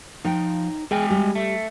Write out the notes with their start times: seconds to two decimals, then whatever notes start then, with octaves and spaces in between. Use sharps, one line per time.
0.25 F3 D#4 C#5 G5
0.91 G#3 G#4 G5 G#5
1.10 G3
1.35 A3